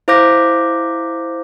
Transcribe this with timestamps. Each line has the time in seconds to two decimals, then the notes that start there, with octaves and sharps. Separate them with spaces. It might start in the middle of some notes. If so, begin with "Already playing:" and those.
0.08 E4 C5 F5 D6 G6 A#6